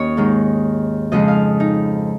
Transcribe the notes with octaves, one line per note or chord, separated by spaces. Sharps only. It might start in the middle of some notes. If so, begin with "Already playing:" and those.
Already playing: D#2 A#3 C#4 C#5 D#5
G#2 D#3 G#3
F2 C#3 F3 G#3 D#5
F5
D#4